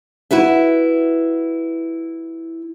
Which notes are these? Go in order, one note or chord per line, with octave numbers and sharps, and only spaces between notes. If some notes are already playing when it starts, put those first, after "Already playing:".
E4 F#4 B4 E5